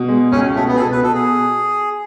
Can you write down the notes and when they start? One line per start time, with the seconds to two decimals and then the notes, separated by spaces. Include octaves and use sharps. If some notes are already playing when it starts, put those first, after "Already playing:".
Already playing: B2
0.08 G#3
0.32 C#2 C#4
0.56 B2 A3
0.68 B3
0.76 G#4
0.79 B2 A4
0.92 B4
1.03 B2 A4
1.15 G#4